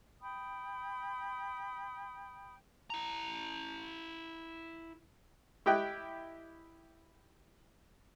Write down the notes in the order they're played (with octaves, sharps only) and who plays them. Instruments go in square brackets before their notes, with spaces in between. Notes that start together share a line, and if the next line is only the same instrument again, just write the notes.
[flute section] G5 B5 D#6
[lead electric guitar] E4 A#5
[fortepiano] E4 G4 D#5 G5 F#6